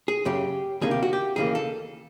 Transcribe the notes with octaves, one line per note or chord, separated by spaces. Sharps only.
G#4
F#2 C#3 F#3 G4
D2 C3 D#3 G3 A#3 G#4
G4
F#4
G4
D#2 C#3 E3 G3 A#3 G#4
A4